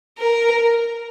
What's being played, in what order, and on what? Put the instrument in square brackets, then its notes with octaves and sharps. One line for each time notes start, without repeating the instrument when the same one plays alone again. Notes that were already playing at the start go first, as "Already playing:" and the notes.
[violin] A#4